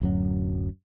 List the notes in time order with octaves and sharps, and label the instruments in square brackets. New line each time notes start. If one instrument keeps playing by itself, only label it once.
[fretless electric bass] D1 F#2 F#3